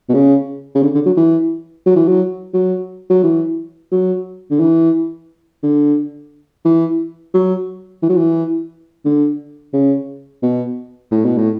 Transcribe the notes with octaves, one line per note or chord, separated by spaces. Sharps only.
B2
C#3
C#3
D3
D3
F#3
E3
F#3
E3
F#3
F#3
F#3
E3
F#3
D3
E3
D3
E3
F#3
E3
F#3
E3
D3
C#3
B2
A2
B2
A2